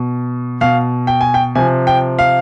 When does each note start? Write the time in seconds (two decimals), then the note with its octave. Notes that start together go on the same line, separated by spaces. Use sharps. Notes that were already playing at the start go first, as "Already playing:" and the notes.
Already playing: B2
0.61 B2 F5
1.07 G5
1.21 G#5
1.34 G5
1.55 C3 F3 G#5
1.87 G5
2.19 F5